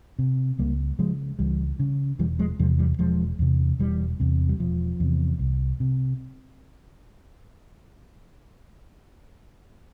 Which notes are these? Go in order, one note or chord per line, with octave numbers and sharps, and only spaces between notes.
C3
C#2 G3 A#3
C#3 F3 G#3
C#2 E3 G3
C#3
E1 E3 G3
F3 G#3
E2 C3 F3 G#3
E3 G3
E1 F3 G#3
E2 C3
E1 E3 G3
E2 C3
G3
E1 F3
E2 C3
C2
C3